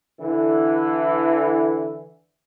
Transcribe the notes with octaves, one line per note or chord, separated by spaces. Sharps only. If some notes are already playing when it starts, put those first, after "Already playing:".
D3 E3